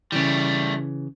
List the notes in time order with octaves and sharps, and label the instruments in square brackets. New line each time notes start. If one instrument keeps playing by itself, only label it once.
[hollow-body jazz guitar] C#3 E3 [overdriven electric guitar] G3 A3